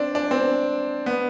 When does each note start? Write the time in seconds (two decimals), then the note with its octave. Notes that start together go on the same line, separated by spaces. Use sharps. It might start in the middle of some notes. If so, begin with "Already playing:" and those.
Already playing: C4 D4
0.15 D4
0.31 C4
1.06 B3